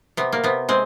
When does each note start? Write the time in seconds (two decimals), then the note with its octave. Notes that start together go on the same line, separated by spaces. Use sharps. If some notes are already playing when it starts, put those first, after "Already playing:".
0.17 C3 B3
0.32 A#3
0.44 C3 B3
0.69 G#3 C4